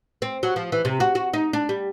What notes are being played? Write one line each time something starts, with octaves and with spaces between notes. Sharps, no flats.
C4
F#3
F3
E3
C3
F#4
F#4
D#4
D4
G3